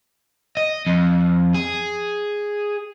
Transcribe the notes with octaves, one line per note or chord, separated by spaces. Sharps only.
D#5
F2
G#4